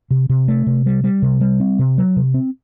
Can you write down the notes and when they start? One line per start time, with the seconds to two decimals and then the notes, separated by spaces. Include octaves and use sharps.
0.11 C3
0.29 C3
0.48 A3
0.67 C3
0.86 G3
1.04 G3
1.22 C3
1.41 G3
1.60 C4
1.79 C3
1.98 F#3
2.16 C3
2.34 C4